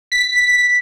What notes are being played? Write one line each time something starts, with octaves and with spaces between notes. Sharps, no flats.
B6